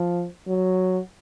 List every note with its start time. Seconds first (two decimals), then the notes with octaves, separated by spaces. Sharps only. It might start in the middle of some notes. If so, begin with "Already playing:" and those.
Already playing: F3
0.47 F#3